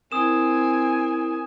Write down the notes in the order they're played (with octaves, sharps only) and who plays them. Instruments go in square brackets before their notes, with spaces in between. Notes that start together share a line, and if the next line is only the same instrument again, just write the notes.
[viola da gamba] C4 [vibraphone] E4 A#4 [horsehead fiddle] G#5 [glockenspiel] D#6 E7